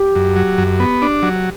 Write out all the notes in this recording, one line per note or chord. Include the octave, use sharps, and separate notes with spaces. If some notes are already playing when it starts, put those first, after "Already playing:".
Already playing: G4
F#2
F#3
F#2
B3
D4
F#3